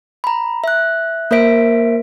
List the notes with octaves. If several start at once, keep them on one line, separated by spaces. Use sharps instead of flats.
A#5 B5
E5 F#6
A#3 A#4 C5 E5 B6 D7